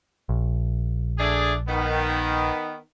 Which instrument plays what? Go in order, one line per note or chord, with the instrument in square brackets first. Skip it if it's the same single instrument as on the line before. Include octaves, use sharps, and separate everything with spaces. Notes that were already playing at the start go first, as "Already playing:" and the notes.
[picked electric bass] A#1
[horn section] A3 D4 G#4
D#3 B3